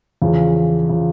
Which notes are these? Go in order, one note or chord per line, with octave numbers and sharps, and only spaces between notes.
E2 C#3 F3
C#3 F3